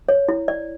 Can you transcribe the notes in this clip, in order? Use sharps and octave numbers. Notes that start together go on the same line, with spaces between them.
C#5
E4
D5